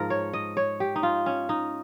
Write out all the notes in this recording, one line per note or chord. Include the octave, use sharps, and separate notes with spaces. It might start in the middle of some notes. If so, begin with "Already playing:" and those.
Already playing: G#2 F3 A#4
C#5
D#5
C#5
G4
D#4
F4
C#4
D#4